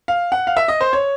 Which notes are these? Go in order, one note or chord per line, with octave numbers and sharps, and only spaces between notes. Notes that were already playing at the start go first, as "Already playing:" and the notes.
F5
F#5
F5
E5
D#5
C5
C#5